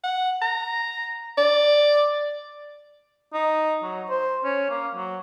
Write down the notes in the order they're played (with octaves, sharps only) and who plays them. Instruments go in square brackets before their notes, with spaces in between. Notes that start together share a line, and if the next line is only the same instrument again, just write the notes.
[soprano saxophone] F#5
A#5
D5
[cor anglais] D#4
F#3
C5
C#4
A#3
F#3